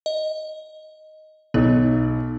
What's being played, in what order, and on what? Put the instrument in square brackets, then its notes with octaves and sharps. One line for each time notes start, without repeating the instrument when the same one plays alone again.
[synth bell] D#5
[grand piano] B1 D#4 [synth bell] B3